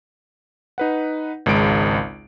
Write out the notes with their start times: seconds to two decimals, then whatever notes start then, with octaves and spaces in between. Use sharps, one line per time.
0.78 D#4 B4 F#5
1.46 G#1 C#2 G#3 D7